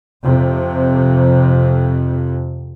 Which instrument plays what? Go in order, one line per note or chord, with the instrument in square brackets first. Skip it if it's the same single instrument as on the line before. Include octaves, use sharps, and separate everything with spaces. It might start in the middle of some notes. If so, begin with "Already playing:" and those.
[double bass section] F2 C3